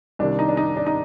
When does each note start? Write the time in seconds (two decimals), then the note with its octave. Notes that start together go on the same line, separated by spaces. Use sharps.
0.19 C2 C3 D#3 D4
0.39 D#4
0.49 D4
0.57 D#4
0.77 D4
0.86 D#4